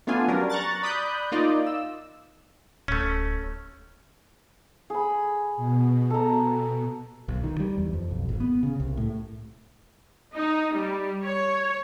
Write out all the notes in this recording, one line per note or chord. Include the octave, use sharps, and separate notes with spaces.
A3 B3 D4 F4 G#5
F#3 G3 C#4 D4 A#4
A#5 C#6 F#6 A6
D5 B5 D#6 F#6 G6
A#3 D#4 F4 D5 D#5
E6
D1 A3 C#4
G#4 B5
B2
A4 A#5
B1
D#3
G3
E2
F2
B1
G#1
B3
C#3
C2
A2
D#4
G3
C#5